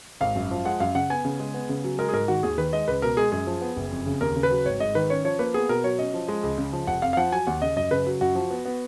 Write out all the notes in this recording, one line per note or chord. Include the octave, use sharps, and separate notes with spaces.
G#1 F5
F#2
F3
G#3 F#5
F#2 F5
C#3 F#5
B3 G#5
C#3
G#3
B3
C#3
F#3
G#3 A#4
G#4
G#2 A#4
D#3 F#4
D#2 G#4
D#3 B4
G#3 D#5
C#2 B4
B2 A#4
G#3 G#4
F#2 G#4
F3
B3
F#1
F2
C#3
D#2 A#4
C#3
B4
F#3
G#1 C#5
G#2 D#5
D#3 B4
C#4 C#5
F3 C#5
A#3 B4
B3 G#4
B2 A#4
F#3 C#5
C#4 D#5
F3
G#3
C#2
C#3
F3
F1 F#5
F2 F5
F5
F3 F#5
F#3 G#5
D#2 F#5
C#3 D#5
F#2 D#5
C#3 B4
F#3
F#2 F#4
F3
B3
B3